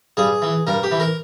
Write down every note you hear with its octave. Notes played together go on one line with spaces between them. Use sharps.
G2 G#4
E3
G2 A#4
G4
E3
A#4